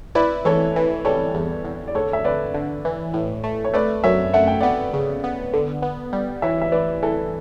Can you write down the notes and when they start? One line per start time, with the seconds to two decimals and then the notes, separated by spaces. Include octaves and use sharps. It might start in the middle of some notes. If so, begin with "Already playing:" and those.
0.15 E4 B4 D5
0.45 E3 A4 C#5
0.76 E3
1.05 G3 A4 C#5
1.35 E2
1.65 E2
1.88 D5
1.95 D3 A4 C#5
2.13 E5
2.24 D3 B4 D5
2.54 D3
2.85 E3
3.14 A2
3.44 A3
3.65 C#5
3.74 A3 B4 D5
4.04 F#2 C#5 E5
4.33 A3 F#5
4.47 G5
4.60 B3 D5 F#5
4.94 C#3
5.24 B3
5.54 D3
5.82 B3
6.13 G3
6.42 E3 C#5 E5
6.62 E5
6.72 E3 B4 D5
7.03 E3 A4